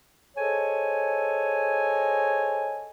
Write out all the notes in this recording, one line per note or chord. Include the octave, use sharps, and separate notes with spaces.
G#4 A4 C5 C#5 D#5 G#5